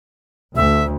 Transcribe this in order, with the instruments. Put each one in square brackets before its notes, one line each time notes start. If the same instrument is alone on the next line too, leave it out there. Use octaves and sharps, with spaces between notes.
[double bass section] D2 [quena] E5